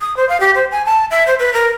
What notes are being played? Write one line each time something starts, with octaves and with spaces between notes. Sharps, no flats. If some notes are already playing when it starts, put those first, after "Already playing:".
D#6
C5
F5
G4
C5
G#5
A5
E5
C5
B4
A#4